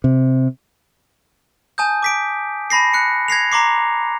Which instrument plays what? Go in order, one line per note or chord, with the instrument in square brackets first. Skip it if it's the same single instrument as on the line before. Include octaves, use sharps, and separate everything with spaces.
[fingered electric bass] C3
[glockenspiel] G#5 A5 D#6 G6
D6 B6 D7
A5 B5 A#6 C7
F#6 C#7
G#6 A#6 C7 F7
A#5 C6 D6 C7